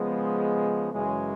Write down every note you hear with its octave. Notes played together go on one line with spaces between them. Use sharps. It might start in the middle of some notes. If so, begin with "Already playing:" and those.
Already playing: C#3 F3 G#3 B3
F#2 C#3 E3 G#3